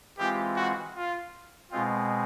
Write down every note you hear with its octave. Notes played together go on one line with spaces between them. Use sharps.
E3 G#3 C4 F4 G4
F#4
F4
B2 G#3 C4 F4